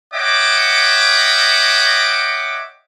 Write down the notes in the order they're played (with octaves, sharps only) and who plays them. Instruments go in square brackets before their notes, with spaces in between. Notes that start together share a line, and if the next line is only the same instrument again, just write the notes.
[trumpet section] C#5 D#5 E5 F#5 G5 D6